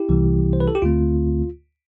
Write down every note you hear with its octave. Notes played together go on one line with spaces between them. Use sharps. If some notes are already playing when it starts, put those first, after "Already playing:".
Already playing: E4 G4
C2 C3 E3 G3 B3
C5
B4
A4
G4
D2 D3 A3 C4 F4